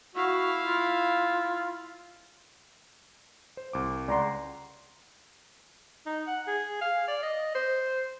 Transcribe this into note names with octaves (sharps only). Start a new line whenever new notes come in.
E4 F#4 F5
F4
C5
C2 D6
C#2 D5 F#5 A#5 C6
D#4
F#5
G#4
F5
D5
D#5
C5